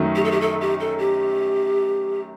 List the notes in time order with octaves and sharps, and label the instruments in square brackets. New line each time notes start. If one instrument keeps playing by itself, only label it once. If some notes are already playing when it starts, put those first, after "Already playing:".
Already playing: [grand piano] F#2 D#3 F#3 A3
[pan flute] G4
A4
G4
A4
G4
A4
G4